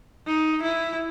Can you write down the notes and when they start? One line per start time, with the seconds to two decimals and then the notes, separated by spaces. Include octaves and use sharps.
0.27 D#4
0.63 E4